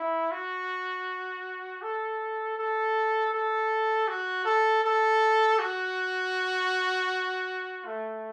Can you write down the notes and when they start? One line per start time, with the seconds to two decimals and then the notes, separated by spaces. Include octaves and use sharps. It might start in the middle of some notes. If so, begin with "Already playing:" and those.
Already playing: E4
0.32 F#4
1.82 A4
2.58 A4
3.33 A4
4.08 F#4
4.45 A4
4.84 A4
5.59 F#4
7.85 A3